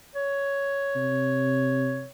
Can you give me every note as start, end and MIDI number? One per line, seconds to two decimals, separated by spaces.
0.15 2.09 73
0.96 2.06 48